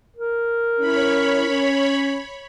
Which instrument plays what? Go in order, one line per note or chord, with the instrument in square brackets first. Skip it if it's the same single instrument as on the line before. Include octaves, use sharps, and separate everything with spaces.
[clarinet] A#4
[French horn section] C#4 E4 [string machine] C#5 B5
[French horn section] C#4